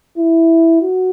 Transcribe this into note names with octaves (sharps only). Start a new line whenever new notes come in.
E4
F#4